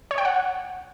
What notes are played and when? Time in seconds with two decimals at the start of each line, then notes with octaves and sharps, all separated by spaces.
0.11 C#5
0.18 G5
0.25 F#5